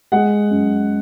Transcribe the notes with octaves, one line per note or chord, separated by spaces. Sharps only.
G#3 F#5
F#2